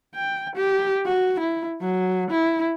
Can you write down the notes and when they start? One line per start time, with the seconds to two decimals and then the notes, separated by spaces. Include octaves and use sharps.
0.15 G5
0.56 G4
1.05 F#4
1.40 E4
1.81 F#3
2.31 E4